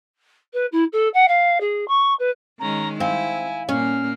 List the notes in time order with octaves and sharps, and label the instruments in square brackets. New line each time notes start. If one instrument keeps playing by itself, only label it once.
[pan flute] B4
E4
A4
F#5
F5
G#4
C#6
B4
[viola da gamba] D#3 G#3 C#4 [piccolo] A#5
[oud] C4 [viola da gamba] E4 [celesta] F5 [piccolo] G#5
[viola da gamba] A#2 A#3 [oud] C#4 [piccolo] F6